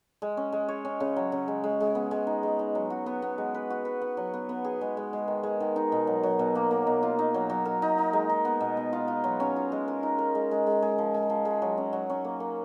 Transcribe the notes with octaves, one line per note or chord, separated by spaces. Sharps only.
G#3
C#4
G#3
C#5
C#4
C#3
F#3
C#3
G#3
G#3
G#3
B3
G#3
D#4
G#3
D#4
F#3
F#4
B3
B3
G#3
B4
F#4
B4
B3
F#3
B3
B3
G#4
G#3
G#3
G#3
D#3
G#3
D#3
D#4
B2
F#3
F#3
B2
A#3
A#3
B2
F4
D#4
F#3
F#3
A#4
D#4
D#4
G#3
D#4
B3
B2
B3
F4
F4
F#3
C#4
F4
G#3
A#4
D#4
A#4
G#3
G#3
G#3
G#3
F3
G#3
F3
G#3
F#3
C#4
F#3
C#4
A#3
A#3